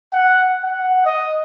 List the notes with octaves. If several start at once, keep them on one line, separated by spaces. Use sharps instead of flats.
F#5
F#5
D#5